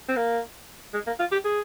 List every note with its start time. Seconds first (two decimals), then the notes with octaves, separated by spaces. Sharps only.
0.09 C4
0.17 A#3
0.93 G#3
1.07 A#3
1.19 F4
1.32 G4
1.45 G#4